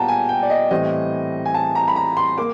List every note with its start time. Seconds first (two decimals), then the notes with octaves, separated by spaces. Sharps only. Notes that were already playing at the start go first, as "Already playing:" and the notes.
Already playing: A#2 G3 B3 F#5 G5 A5 A#5
0.08 G#5
0.29 G5
0.42 D5
0.50 D#5
0.71 A2 E3 G3 C4 D#5
1.46 G#5
1.54 A5
1.75 A#5
1.88 B5
1.96 A#5
2.17 C6
2.38 A#3 D6